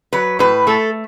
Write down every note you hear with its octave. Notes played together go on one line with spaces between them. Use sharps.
F#3 B4
A2 B4
A3 A4